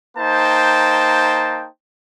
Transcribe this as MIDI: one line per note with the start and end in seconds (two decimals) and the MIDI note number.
0.16 1.67 58
0.16 1.67 63
0.16 1.67 72
0.16 1.67 79
0.16 1.67 81